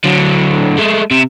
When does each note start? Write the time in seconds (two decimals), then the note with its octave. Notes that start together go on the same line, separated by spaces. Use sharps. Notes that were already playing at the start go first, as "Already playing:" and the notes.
0.04 D3 F#3
0.78 G#3 A3
1.11 C3